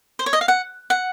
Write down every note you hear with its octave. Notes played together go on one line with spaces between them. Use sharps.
C5
C#5
D#5
F5
F#5
F#5